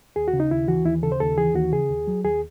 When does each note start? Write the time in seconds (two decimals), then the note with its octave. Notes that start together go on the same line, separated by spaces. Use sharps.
0.16 D#2 G#4
0.28 F#4
0.33 C#3
0.40 D#4
0.51 D#2 E4
0.68 E3 F#4
0.86 D#2 E4
1.03 C#3 A4
1.12 C5
1.20 D#2 A4
1.38 E3 G#4
1.55 D#2 F#4
1.72 C#3 G#4
1.90 D#2
2.07 F#3
2.24 D#2 G#4